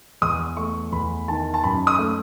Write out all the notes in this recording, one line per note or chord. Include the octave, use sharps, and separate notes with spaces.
E2 D#6
A3 C#6
E2 B5
D#3 A5
A5
F#2 B5
D#6
A3